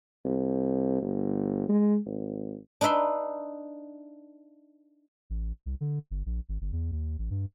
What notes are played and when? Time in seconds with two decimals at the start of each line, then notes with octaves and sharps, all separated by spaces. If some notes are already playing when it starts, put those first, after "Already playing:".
0.25 C2
1.02 G1
1.69 G#3
2.05 G#1
2.81 D4 D#4 B4 E5 C6
5.30 A1
5.66 C2
5.81 D3
6.11 G1
6.26 A#1
6.49 G#1
6.61 G1
6.72 E2
6.91 D#2
7.18 A1
7.30 G2